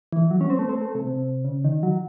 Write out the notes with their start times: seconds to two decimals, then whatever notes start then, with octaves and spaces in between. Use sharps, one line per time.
0.13 E3
0.31 F#3
0.41 C#4
0.50 C4
0.59 A3
0.69 C4
0.82 A3
0.95 C3
1.07 C3
1.44 C#3
1.64 D#3
1.83 F#3